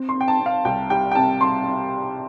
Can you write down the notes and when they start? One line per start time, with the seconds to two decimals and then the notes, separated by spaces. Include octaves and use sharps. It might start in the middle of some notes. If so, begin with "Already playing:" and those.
Already playing: C4
0.09 C6
0.15 C4
0.21 G5
0.28 A5
0.40 C4
0.46 F5
0.65 C2 G5
0.90 G3 G5
1.12 G5
1.15 C3 A5
1.41 C4 C6
1.66 C4